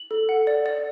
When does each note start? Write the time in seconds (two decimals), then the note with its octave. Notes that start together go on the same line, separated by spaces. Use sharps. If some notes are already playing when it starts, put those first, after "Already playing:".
Already playing: F#7
0.11 A4
0.29 F#5
0.47 D5
0.66 D5